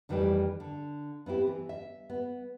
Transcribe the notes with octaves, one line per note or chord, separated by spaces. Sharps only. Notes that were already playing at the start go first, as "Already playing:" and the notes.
F2 D#3 E3 G3 A3 G4
D3
B3 C4 E4 G4
E3
E5
B3